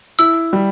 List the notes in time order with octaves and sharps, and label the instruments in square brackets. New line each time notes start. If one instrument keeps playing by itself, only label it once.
[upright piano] E4 [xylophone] E6
[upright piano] G3